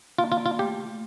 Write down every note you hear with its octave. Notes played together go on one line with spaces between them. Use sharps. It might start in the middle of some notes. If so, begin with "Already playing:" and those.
A#3 F4
F4
D5
F4
A3 G4
A3